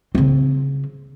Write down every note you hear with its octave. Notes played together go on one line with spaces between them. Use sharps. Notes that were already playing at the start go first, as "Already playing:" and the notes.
C#3 C4